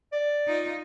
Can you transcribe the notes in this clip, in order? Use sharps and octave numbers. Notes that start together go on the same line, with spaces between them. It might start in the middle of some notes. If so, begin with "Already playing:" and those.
D5
D#4 F4